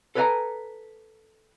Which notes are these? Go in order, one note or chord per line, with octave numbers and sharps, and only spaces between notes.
A4 B4 C#5 F5 G#5 A#5